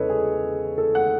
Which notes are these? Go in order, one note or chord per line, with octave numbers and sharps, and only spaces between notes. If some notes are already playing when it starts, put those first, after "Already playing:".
Already playing: E2 C#3 G#3 A4 B4 C#5 D#5
G#4
A4
F#5